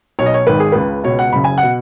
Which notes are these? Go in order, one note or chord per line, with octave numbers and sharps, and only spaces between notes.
B1 B2 C#5
D#5
C#5
G#1 G#2 D#3 B4
G#4
C#2 C#3 B4
C#2 B2 C#5
F#5
F#1 F#2 C#3 B5
G#5
F#5
B2